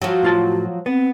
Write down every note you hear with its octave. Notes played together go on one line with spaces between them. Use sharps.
F3 F#3 F#4
A2 F4 A5
B3 C4